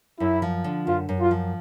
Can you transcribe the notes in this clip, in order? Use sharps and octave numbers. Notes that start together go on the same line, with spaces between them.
F#2 E4
F3
D3
F#2 F4
F#2
F4
F3